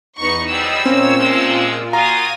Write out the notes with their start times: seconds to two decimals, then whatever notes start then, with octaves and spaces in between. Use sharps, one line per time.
0.17 E2 B3 D#4 C#6
0.49 G#2 F#3 G3 D#5 G5 B5 E6
0.86 A#2 A#3 C4 C#4 F4 C#5
1.18 C3 F3 G#3
1.93 F4 F#4 F5 G#5 A#5 D#6 D#7